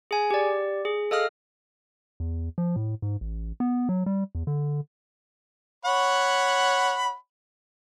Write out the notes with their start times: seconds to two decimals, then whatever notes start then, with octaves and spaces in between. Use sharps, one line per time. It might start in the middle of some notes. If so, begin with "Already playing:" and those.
0.11 G#4 G#5
0.31 G4 D5
0.85 G#4
1.11 A4 D#5 F5 D#6 F6
2.20 E2
2.58 F3
2.76 A2
3.02 G#2
3.21 A1
3.60 B3
3.89 F#3
4.06 G3
4.35 E2
4.47 D3
5.85 C#5 F#5 B5